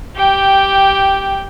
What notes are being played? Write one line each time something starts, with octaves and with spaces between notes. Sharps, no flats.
G4 G5